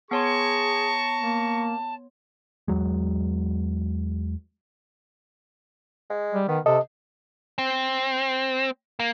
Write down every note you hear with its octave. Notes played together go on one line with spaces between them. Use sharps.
B3 G#4 C#5 A5 A#5 C6 C#6
A#3
E2 F#3 G#3
G#3
G3
D#3 B3
C3 A4 D#5
C4
A#3